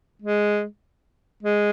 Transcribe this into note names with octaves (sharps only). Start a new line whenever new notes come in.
G#3
G#3